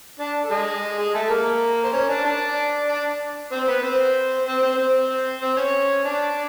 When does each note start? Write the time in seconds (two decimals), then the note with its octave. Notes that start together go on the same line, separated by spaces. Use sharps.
0.19 D4 D5
0.44 A4
0.50 G#3 G#4
0.98 G#3 G#4
1.14 A3 A4
1.30 A#3 A#4
1.84 C5
1.93 C#4 C#5
2.09 D4 D5
2.25 D4 D5
2.88 D4 D5
3.52 C4 C5
3.68 B3 B4
3.83 C4 C5
4.47 C4 C5
4.62 C4 C5
4.78 C4 C5
5.41 C4 C5
5.57 C#4 C#5
6.04 D4 D5